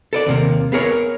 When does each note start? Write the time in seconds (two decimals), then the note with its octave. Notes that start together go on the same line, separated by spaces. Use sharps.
0.13 A4 A#4 D5
0.27 D#2 C3 A#3
0.72 B3 G#4 A#4 C#5